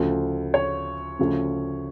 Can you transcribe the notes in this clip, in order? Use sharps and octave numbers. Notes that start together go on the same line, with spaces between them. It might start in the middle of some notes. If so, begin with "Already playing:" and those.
Already playing: D2 C#3 F3
C#5
D2 C#3 F3